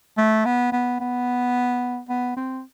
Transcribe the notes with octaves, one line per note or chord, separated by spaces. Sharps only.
A3
B3
B3
B3
B3
C4